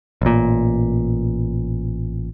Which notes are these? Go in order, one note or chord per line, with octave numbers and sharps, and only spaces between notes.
A1 A#2